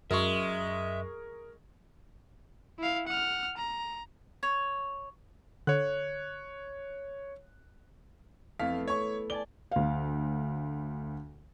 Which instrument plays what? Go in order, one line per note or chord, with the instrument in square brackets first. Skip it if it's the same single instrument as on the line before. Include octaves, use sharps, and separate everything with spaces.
[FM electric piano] F#2 [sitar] G#3 [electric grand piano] A#4 C#6 [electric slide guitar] E5
[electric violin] E4 F5
F#5 F6
A#5
[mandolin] C#5
[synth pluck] D3 [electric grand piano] C#5 F#6
[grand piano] F2 F5 B6 [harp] A3 B3 E4
[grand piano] C#5 C#6
[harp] D5 G#5 A5 [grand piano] G7
[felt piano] D2 F5